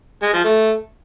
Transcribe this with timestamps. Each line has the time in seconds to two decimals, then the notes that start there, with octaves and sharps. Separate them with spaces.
0.23 G#3
0.34 F3
0.45 A3